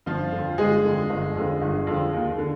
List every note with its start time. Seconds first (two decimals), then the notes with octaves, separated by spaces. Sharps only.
0.06 G1 F3 F4
0.32 F2 D3
0.58 G1 G#3 G#4
0.84 F2 D3
1.10 G1
1.35 F2 D3
1.62 G1
1.87 F2 D3
2.13 D#2
2.38 D3